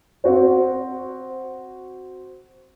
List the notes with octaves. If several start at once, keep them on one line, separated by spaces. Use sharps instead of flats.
C4 F#4 C5